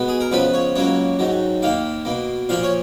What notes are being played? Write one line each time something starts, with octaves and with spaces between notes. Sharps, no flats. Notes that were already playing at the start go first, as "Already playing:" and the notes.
Already playing: B2 G#3 B3
G#4
A#4
C#2 C#3 F3 B3 B4
C#5
C#2 C#3 F#3 A#3 C#5
G#2 D#3 F#3
D#2 D#3 A#3 F5
B2 A#3
A#2 F3 A#3 F5
C#5